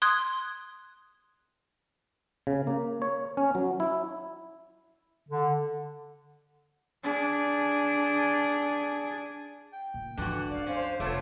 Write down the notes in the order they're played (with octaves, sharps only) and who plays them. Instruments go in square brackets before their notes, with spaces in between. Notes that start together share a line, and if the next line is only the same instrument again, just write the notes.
[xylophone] C6 D#6 F#6 G#6
[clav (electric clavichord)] C#3
A#3
C#5
C#4
F#3
E4
[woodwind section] D3
[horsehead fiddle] D4 G#4
[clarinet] G5
[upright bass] A#2
[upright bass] G#2 F3 [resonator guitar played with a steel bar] D3 F#4 [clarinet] E3 [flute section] F#6
[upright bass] F#2 [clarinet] D5 [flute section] F5
[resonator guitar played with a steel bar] C#4 [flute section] C5 F5
[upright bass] F1 [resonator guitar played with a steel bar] A3 B3 F4 [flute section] A4 C#5 [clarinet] D6